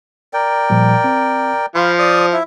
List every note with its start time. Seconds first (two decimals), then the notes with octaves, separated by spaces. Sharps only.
0.33 A#4 D5 G5
0.70 A#2 F3 G3
1.04 C4
1.76 F3 F5 B5 C6
1.99 D5 D#6
2.33 E4 E5